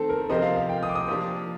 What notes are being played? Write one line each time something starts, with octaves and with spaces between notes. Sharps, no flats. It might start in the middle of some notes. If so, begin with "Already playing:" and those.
Already playing: D#3 A3 C4 A4
A#4
C3 F3 C4 G4 D#5
F5
F5
G5
D#6
D6
D#6
F3 A#3 D4 G4